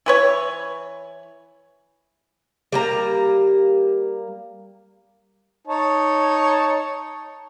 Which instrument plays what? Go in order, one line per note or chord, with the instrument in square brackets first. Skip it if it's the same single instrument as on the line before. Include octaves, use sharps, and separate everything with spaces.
[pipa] E3 B4 C#5
[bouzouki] G3 A#3 A#5
[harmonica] D#4 C#5 A5